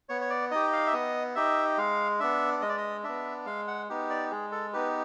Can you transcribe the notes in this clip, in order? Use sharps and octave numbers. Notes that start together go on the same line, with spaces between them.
B3 C#5
C#5
D5
D#4 G4 D#5
F5
E5
B3 D#5
D#4 G4 E5
G#3 F5
B3 D4 E5
G#3 D#5
D5
D#5
B3 D4 E5
G#3 F5
F#5
B3 D#4 G4
D5
G#3 G#4
A4
B3 D#4 G4 B4